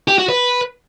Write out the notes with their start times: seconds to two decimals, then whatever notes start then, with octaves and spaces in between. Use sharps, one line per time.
0.08 G4
0.18 F#4
0.29 B4